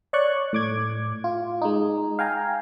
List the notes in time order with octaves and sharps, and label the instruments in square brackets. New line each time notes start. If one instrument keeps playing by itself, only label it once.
[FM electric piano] C#5 D5 C#6 F#6
A2 D6 G#6
F4
G#3 D#4
F5 G5 G#5 A#5